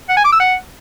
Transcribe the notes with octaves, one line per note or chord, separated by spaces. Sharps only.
F#5
G#5
D6
E6
F#5